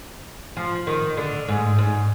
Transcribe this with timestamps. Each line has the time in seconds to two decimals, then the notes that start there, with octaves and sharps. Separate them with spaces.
0.57 F3
0.87 D#3
1.17 D3
1.48 G#2
1.78 G#2